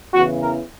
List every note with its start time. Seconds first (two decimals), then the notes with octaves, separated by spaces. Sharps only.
0.13 E2 C#3 E3 F#4
0.41 A#4